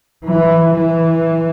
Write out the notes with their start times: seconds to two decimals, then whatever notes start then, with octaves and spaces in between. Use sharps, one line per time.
0.25 E3
0.74 E3